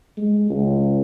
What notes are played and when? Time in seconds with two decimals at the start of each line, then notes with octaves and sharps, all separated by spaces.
0.17 G#3
0.50 C#2